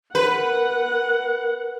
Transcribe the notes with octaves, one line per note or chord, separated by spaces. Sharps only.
A#4 B4 F#5